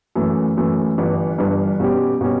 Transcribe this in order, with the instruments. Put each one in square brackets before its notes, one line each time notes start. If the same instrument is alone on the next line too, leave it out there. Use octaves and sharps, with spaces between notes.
[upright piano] F#2 E3 A3
F#2 E3 A3
G1 G2 E3
G1 G2 E3
B2 G3 C#4 G4
B2 G3 C#4 G4